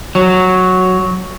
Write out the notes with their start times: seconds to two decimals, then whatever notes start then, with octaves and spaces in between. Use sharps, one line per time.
0.15 F#3